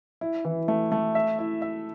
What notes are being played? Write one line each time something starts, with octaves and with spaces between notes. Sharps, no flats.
E4
E3
A3
A3
E5
E4
E5